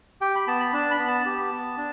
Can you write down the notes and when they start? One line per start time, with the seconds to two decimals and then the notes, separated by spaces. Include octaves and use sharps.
0.21 G4 G5
0.35 B5
0.47 B3 A5
0.60 B5
0.73 D4 A5
0.91 B5
0.99 B3
1.08 A5
1.26 G4
1.52 B3
1.77 D4